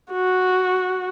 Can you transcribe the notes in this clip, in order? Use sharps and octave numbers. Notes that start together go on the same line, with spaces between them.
F#4